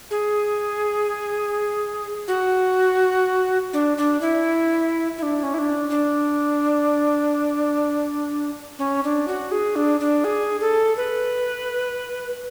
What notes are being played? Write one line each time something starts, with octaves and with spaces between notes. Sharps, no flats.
G#4
F#4
D4
D4
E4
E4
D4
C#4
E4
D4
D4
C#4
D4
F#4
G#4
D4
D4
G#4
A4
B4